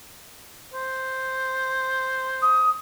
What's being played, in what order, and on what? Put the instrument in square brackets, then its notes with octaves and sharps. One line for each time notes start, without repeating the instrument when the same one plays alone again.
[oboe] C5
[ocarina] D#6